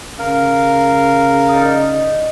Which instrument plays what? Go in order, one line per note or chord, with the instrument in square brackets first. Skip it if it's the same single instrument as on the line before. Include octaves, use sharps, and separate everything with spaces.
[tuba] C#3 [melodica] A#4 F5
[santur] D#4 D5 D#6